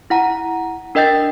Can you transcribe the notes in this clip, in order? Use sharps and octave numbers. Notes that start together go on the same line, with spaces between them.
E4 F#5 A#5
D4 A#4 D#5 G5 G6 A6